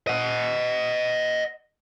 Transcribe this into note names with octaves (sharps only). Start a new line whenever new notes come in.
D#5 F#5